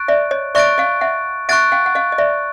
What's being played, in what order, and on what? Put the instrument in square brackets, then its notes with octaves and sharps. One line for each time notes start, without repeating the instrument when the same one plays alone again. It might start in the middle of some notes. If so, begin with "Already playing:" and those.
Already playing: [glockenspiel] C#6 F#6 A6 D7
[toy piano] D5 E5
C#5 D#5
[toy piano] D5 E5 [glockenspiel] C#6 F#6 A6 D7
[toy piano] D#5 F5
E5 F#5
[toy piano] E5 F#5 [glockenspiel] C#6 F#6 A6 D7
[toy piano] F5 G5
F#5
D#5 F5
D#5
D5 E5